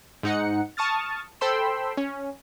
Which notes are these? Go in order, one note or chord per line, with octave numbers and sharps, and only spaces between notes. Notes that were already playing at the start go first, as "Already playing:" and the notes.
G#2 D#4 F#5 C#7
A5 C#6 D#6 F6 A6
A4 C5 G5 B5 C6 E6
C#4